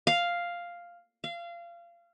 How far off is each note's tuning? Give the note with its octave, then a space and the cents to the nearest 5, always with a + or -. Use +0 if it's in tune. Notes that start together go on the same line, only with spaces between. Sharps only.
F5 +0
F5 -25